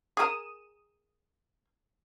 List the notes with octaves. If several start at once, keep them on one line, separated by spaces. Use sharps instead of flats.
G#4 A#4 D#6 D#7 E7